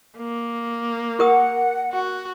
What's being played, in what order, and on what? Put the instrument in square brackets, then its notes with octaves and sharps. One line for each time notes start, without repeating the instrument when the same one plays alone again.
[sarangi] A#3
[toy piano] G4 A#4 D#6 [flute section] F#5
[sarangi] F#4